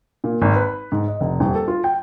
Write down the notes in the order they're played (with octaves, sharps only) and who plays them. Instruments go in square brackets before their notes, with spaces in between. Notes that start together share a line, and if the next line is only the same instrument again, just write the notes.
[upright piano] A#2
G#1
B4
G#2
D#5
F1
D#1
A4
F4
G5